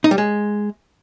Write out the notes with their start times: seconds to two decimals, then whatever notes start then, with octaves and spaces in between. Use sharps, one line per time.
0.04 D#4
0.11 G3
0.18 G#3